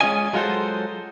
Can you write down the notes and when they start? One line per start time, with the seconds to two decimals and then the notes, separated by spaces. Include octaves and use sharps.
0.01 G#3 A3 C#4 F4 D#5 G#5
0.33 F#3 G#3 F4 F#4 A4 C5